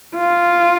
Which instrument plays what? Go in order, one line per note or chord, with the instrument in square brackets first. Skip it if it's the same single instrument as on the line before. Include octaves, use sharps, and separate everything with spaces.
[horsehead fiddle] F4